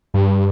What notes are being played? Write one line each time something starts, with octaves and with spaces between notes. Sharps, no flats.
G2